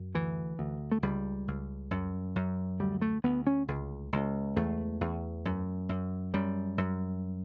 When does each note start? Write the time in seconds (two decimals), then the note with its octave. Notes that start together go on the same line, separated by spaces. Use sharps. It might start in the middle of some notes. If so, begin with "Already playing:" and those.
Already playing: F#2
0.15 D2 E3
0.59 D2
0.92 A3
1.02 C#2 G3
1.48 C#2
1.91 F#2
2.36 F#2
2.80 D2 G3
3.02 A3
3.24 D2 B3
3.47 C#4
3.68 C#2
4.13 C#2
4.56 E2 A3
5.01 E2
5.45 F#2
5.89 F#2
6.34 F#2 G3
6.78 F#2